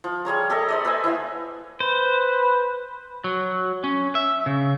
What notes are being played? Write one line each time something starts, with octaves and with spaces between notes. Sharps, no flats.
F3
G3 G#4 C#5 A#5
G4 A4 A#4 D#5
C5 D5 D#5
B4 C5 E5 G#5
E4 C5 F5 F#5
B4 C5
F#3
C#4
E5
C#3